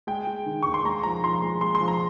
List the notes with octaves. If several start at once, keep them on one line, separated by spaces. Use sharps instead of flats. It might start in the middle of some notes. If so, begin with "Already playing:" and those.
G#3 G5
G#3
D#3
D#2 C#6
C6
G#3 A#5
F3 A#5
F3 C6
G#3
G#3 C6
C6
F3
A#5